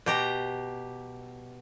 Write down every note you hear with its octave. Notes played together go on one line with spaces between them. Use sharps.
B2 G4 A#5